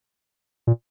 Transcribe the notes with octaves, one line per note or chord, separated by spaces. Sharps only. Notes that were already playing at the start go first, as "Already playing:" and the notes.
A#2